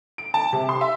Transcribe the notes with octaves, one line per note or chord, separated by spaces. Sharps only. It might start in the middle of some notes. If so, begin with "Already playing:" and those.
D7
A5
C3
C6
E5